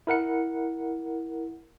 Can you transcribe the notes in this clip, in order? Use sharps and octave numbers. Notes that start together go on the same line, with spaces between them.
E4 A#4 F#5 C#7